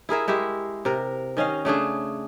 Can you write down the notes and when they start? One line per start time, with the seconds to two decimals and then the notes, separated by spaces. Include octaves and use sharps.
0.09 E4 G#4 A#4 E5
0.28 G#3 E4 G4 E5
0.85 C3 A#4
1.37 D#3 C#4 D#5 F5
1.65 C#3 A3 D4 G#4